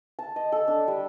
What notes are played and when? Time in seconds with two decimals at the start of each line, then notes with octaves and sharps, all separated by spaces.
0.19 A5
0.36 D#5
0.52 A4
0.68 D4
0.88 G3